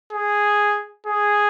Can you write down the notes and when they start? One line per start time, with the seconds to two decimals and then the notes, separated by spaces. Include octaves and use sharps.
0.12 G#4
1.07 G#4